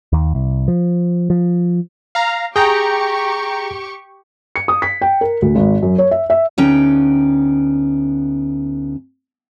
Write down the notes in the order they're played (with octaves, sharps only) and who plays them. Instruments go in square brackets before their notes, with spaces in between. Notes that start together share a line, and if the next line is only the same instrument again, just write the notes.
[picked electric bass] D#2
C2
F3
F3
[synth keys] F5 A#5
[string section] G4 C#6 [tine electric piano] G#4 G6 [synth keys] G5 A#5
[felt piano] C#7
D#6
B6
G5
A#4
D2
G#1
F#2
C#5
E5
E5
[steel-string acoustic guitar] D2 B3 C#4 D#4 G5